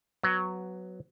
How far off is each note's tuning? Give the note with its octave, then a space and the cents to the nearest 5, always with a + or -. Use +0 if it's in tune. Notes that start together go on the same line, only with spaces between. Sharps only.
F#3 +0 B3 +15